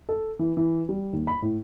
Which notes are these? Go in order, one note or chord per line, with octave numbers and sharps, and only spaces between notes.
A4
E3
E3
G3
D#2
B5
A2